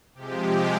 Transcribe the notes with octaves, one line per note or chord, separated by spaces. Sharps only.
C3 F3 G#3 G4